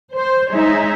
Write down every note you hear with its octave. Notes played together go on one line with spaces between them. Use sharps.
C5
G#3 D#4 C#5 E5